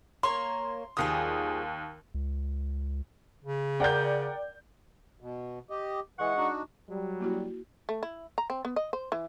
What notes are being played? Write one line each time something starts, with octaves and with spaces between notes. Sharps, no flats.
A#3 C#5 C6
D#2 F3 G3 G#4 D#6
C#2
C#3
A#4 D5 F#5 G5 G6
B2
G4 D#5
E3 G#3 F#5 C#6
D4 D#4 F#4
F#3 G3
A#3 E4 F#4
A3
E4
A#5
C4
B3
D#5
C5
E3